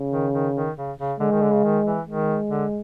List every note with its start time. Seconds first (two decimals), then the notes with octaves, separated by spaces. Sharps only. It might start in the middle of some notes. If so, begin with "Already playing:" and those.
Already playing: C#3
0.12 D#3
0.33 D#3
0.56 D#3
0.77 C#3
0.98 C#3
1.20 D3 G#3
1.31 D#3
1.42 D3
1.53 C#3
1.64 D#3
1.86 E3
2.07 D#3 G#3
2.50 D3